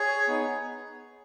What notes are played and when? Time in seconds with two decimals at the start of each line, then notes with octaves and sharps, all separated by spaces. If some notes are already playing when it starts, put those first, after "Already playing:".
Already playing: G#4 C#5
0.27 B3 D#4